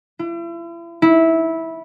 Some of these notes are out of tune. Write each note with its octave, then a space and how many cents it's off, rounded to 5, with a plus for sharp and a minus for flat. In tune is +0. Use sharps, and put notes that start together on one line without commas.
E4 +40
E4 -15